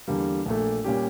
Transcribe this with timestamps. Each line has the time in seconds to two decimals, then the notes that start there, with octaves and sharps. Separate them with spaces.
0.08 E2 D3 G3 A#3
0.46 A#1 A#2 A3
0.84 A#2 G3 C#4 G4